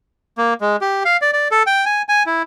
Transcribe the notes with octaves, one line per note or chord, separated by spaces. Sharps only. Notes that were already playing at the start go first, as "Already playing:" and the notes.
A#3
G#3
G4
F5
D5
D5
A4
G5
G#5
G#5
E4